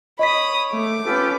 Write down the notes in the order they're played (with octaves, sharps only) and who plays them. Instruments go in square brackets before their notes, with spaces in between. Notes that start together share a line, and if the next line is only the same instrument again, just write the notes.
[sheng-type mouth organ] C#5 [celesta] D#5 B6 [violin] B5 D#6
[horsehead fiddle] A3 [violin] D6
[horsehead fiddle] C#4 B4 [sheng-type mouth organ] F4 G4 A4